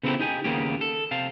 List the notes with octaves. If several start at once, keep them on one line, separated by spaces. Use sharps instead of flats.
C#3 B3 C4 E4 G4 A4
D#4 G4 G#5
D#2 C#3 A#3 B3 G4
A4
C3 F5 A5